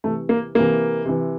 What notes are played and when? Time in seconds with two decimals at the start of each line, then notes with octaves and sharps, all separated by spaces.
0.04 C3 E3 A3
0.29 A#3
0.55 C3 E3 A#3
1.05 C3 E3